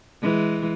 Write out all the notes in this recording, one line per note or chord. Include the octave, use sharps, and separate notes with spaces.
E3 G#3